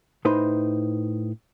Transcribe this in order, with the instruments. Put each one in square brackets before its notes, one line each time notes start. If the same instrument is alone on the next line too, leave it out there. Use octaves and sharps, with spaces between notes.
[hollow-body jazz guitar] A2 D#4 B4 C5